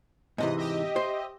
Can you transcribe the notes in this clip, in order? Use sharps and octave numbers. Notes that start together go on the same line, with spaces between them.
G#2 C3 E3 D#5
G4 D#5 E5
C5